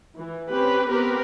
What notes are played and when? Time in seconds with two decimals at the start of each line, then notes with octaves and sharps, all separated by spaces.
0.16 E3
0.50 C4 C#4 G4 B4
0.88 B3 C4 G4 A#4 B4